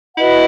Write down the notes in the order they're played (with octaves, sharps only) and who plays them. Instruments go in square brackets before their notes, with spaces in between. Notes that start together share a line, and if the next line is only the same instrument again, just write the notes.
[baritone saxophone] E4 [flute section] F#4 B4 D#5 F#5